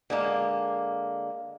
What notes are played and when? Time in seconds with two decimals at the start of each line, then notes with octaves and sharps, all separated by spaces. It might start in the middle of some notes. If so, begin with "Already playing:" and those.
0.10 D3 G#3 A#3